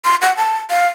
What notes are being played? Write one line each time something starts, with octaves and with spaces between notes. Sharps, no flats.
C6
F#5
A5
F5